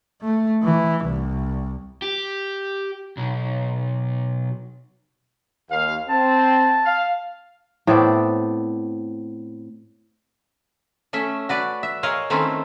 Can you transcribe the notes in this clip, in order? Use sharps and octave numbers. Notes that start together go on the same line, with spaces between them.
A3
E3
C2
G4
B1
D#2 F5
C4 A5
F5
A2 B3 C4 D5
A3 C#4 E5
F#4 B4 D5
E5
G#4 A#4 C#5 D#5 F5
D#3 A3 C4 C#4 E4 F4